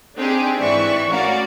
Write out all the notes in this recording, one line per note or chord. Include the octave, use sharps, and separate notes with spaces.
C4 D4 D#4 G4 G#4
G#2 E3 D5 E5 B5 C#6
A3 C#4 F#4 A#4 D5 F5